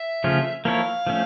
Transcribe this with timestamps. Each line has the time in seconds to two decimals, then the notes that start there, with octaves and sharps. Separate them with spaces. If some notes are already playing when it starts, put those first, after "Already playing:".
Already playing: E5
0.24 C#3 F3 A3 C#4 F4
0.65 F3 A#3 E4 A4 C#5 F5
1.07 F3 A3 C#4